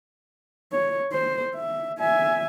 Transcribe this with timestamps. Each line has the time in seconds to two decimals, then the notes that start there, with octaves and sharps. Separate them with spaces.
0.72 C#5
1.12 C5
1.55 E5
2.00 E5 G#5